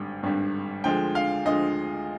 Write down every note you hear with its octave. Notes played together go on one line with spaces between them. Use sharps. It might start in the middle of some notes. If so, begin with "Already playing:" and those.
Already playing: G#1 G2 D3 G3
G#1 G2 D3 G3
D2 D3 F3 G#3 G5
F5
D2 D3 F3 G#3 D#5